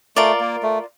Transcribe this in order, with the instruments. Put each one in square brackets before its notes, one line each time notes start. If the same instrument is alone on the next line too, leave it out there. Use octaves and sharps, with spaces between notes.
[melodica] A3 [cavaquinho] F4 A#4 D5
[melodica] A#3
A3